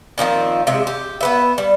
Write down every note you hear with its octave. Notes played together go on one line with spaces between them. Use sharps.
A#2 D#3 F3 C4
C3 G#3 E5
G4
B3 B4 E5
G3